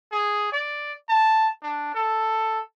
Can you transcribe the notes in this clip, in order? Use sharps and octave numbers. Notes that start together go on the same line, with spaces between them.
G#4
D5
A5
D4
A4